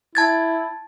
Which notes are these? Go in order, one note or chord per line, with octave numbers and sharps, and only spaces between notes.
E4 A5 G#6 A6